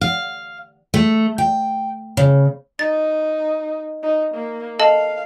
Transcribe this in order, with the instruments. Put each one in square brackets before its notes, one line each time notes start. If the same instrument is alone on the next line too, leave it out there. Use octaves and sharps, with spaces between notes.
[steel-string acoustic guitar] F5
A3
G5
C#3
[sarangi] D#4 [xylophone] A6
[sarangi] D#4
A#3
[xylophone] A4 D#5 A5 [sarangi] F5